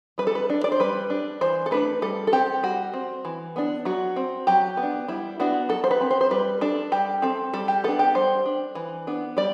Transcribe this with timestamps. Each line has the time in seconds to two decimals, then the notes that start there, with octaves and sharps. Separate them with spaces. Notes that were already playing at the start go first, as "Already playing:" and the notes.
0.18 G3 B4
0.27 A4
0.35 B4
0.50 D4
0.64 D5
0.72 C5
0.80 G3 B4
1.10 D4
1.41 E3 C5
1.66 A4
1.71 A3 D4 B4
2.02 G3 A4
2.27 A4
2.32 C4 G4
2.63 G3 F#4
2.94 C4
3.25 E3
3.56 B3 D4
3.85 F#3 F#4
4.16 C4
4.47 F#3 G4
4.77 B3
4.83 D4
5.08 G3 E4
5.40 B3 D4 F#4
5.69 F#3 A4
5.84 C5
5.91 B4
6.01 C4
6.11 C5
6.21 C5
6.31 G3 B4
6.61 D4 A4
6.92 G3 G4
7.22 C4 A4
7.53 G3 A4
7.68 G4
7.84 B3 D4 A4
7.99 G4
8.15 G3 C5
8.45 D4
8.75 E3
9.07 B3 D4
9.37 G3 D5